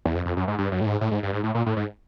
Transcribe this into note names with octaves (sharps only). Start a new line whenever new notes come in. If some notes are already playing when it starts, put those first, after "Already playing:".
E2
F2
F2
F#2
G#2
G2
F#2
A2
G#2
A2
G#2
G2
G#2
A2
A#2
A2
G#2